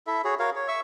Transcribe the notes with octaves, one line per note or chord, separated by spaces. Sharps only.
E4 A4 E5
F#4 G#4 C#5
F#4 A#4 C#5 F5
C#5
E5 C#6 E6